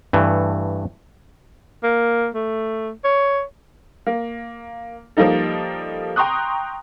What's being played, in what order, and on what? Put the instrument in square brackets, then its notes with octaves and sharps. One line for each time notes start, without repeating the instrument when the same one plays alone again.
[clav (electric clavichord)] G2 E3 A3
[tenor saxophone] A#3
A3
C#5
[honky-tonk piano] A#3
F3 G3 A#3 D#4 A4
G5 A#5 C6 C#6 D#6 F#6